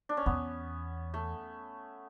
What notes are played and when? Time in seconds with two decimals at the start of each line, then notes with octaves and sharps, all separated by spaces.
0.09 D4
0.17 C#4
0.26 E2 B3
1.14 A3